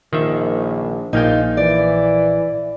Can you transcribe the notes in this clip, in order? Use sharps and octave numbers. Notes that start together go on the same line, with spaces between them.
A#1 D#3 F4 E5
A#1 A#3 D#4 F4 G5
E3 D5